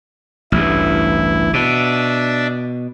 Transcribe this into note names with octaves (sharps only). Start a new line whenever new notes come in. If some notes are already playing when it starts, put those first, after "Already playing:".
A1 D2 G2 E4
B2 D4 D5 E5